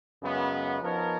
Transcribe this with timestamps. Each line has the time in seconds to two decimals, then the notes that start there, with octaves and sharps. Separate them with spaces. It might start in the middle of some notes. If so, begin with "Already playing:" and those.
0.22 F#2 C#3 G#3 B3
0.81 F3 B3 D#4 A#4 C#5